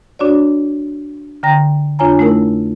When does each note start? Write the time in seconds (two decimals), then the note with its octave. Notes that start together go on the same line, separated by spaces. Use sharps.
0.19 D4 F#4 C#5 D5
1.43 D3 G5 A#5 A#6
1.99 F2 D4 F4 C#5 G#5 A#5
2.19 A3 D#4 E4 A#4